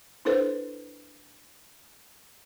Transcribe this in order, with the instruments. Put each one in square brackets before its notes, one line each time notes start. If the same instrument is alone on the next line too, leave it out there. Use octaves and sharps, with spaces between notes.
[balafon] D4 E4 A4 B4 C5